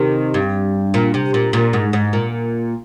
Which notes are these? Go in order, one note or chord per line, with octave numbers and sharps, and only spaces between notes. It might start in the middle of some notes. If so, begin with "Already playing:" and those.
Already playing: C3 D#3
G2
A#2
C3
A#2
A#2
G#2
G#2
A#2